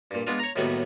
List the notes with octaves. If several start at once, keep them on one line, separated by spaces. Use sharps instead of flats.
G2 A#2
G#3 B3 D4 F4
C#5 A#5
D#2 A2 D#3 F#3 G3 B3